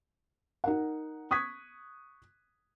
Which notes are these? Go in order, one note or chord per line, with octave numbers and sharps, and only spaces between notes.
D#4 A#4 F#5
C#6 D#6 F#6 G#6 B6